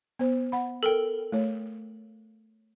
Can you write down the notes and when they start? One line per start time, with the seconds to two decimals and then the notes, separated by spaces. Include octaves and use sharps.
0.19 B3 C5
0.52 F#5 B5
0.83 A4 A#4 G5
1.32 A3 C#5